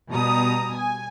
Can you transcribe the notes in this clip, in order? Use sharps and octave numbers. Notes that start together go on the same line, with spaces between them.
B2 G3 A#5 D#6
G#5